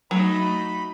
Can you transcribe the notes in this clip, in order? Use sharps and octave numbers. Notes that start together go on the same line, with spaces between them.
F#3 A3 D#4 B5